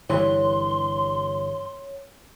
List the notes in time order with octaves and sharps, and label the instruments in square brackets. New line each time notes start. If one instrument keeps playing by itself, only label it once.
[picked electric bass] G1 G2 E3 [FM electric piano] C#5 [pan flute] C6